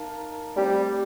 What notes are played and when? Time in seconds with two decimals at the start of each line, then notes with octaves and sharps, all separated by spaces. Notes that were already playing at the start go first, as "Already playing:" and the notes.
Already playing: D#4 A#4 F5 A5
0.56 G3 A3 C4 G4 C5